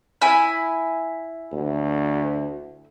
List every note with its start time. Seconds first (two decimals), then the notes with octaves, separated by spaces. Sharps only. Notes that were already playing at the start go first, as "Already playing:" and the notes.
0.22 E4 G#5
1.52 D2